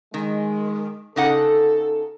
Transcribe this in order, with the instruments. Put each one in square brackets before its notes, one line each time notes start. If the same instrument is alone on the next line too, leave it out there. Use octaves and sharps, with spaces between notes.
[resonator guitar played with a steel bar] D#3 [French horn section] G#3
[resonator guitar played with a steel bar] C#3 D#4 F#5 [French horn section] A4